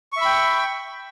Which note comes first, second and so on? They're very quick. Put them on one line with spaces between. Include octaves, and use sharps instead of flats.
C#6 E5 B5 G5